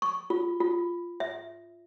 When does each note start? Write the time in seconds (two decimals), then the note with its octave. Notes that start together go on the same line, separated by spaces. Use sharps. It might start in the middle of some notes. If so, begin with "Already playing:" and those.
0.02 C#6
0.30 F4
0.60 F4
1.20 E5